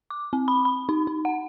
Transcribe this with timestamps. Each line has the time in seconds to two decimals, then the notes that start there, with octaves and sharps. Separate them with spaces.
0.10 D6
0.33 C4
0.48 B5
0.65 B5
0.89 D#4
1.07 D#4
1.25 F#5